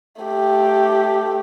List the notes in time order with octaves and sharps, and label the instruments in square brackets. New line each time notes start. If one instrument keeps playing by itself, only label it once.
[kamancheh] A3 G4